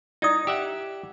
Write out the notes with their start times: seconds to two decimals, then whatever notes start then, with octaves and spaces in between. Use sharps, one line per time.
0.22 D#4 E4 D5 D#6
0.47 G4 E5 F#5